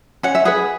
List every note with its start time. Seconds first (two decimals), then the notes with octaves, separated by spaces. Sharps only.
0.23 C#4 F#5
0.35 E5
0.45 G#4 B4 F#5